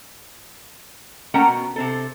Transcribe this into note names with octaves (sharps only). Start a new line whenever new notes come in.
A3 A#3 C#4 F#5 G5 A#5
B2
C3 C4 A4